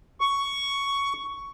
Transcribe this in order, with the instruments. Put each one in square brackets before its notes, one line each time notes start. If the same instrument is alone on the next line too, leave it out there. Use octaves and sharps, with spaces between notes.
[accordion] C#6